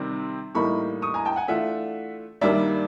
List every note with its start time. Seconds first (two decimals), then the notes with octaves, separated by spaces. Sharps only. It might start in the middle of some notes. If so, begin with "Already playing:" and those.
Already playing: C3 D#3 G3 C4
0.55 A2 E3 G3 A#3 D#4 B5 C#6
1.02 C#6 D#6
1.14 G#5 A#5
1.25 G5 A5
1.36 F#5 G#5
1.48 E3 A3 D4 F4 E5 F#5
2.41 G2 D#3 G3 A#3 D4 D5 E5